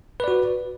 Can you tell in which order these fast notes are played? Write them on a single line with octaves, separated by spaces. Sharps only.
B4 D5 F#4